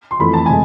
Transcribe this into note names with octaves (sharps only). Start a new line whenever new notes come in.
C6
F2 E3 A3 B5
A5
C3 G#3 G#5